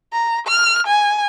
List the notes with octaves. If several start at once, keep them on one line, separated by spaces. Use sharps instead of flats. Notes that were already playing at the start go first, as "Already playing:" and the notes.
A#5
F6
G#5